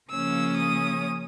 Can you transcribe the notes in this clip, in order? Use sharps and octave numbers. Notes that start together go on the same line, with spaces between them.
C#3 F3 A#3 C#4 E6
D#6